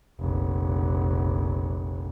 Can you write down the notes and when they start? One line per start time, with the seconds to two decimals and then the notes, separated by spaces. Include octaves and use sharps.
0.19 F1 A#1